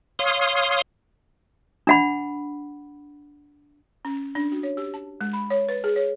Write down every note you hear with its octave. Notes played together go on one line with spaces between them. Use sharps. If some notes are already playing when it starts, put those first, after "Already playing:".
C#5 F5 C6 D#6
D4 F#5 B5
C#4
D4
F#4
C#5
G4
A5
G#3
B5
C#5
B4
G#4
C#5